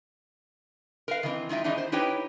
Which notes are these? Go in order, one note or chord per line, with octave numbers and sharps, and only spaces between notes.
A#4 B4 F5
D#3 E3 A#3 C4
G#3 D#4 F4 E5 G5
D#3 E3 G#3 B3 D4 D#4
C5
D#4 E4 G4 B4 C#5 G5